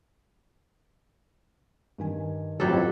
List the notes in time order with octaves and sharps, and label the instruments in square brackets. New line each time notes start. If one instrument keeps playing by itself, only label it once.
[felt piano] G2 D#3 G#5
[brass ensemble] A1 F2 A2 [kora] F#3 G4 A4